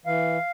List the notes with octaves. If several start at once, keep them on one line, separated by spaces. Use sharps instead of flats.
E3 F5